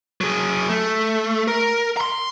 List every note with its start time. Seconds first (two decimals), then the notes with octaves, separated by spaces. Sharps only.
0.21 F#3 G#4
0.69 A3
1.48 A#4
1.97 A#5 C6